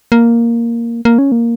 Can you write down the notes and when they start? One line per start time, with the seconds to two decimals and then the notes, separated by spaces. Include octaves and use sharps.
0.12 A#3
1.05 A#3
1.18 C#4
1.32 A#3